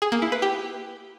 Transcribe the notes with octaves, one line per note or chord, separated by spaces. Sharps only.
G#4
A#3
E4
B4
G4